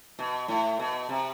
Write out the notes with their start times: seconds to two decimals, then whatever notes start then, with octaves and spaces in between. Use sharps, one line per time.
0.19 B2
0.48 A2
0.79 B2
1.09 C3